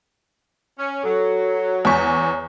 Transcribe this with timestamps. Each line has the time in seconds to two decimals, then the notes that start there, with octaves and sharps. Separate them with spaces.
0.78 C#4
1.03 F#3 A4
1.85 E2 C#5 G#5 C#6 B6